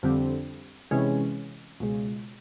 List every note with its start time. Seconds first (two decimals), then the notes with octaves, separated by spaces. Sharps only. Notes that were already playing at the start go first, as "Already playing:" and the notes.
0.03 F2 D3 G3 C4
0.91 C3 E3 G#3 C#4
1.80 C#2 B2 G#3